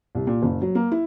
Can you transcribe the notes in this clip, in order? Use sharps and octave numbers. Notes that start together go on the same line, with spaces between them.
C2
A#2
F#1
F#3
A#3
E4